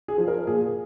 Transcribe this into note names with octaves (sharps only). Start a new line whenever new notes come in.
G#4
F3
A#4
A#2 G#4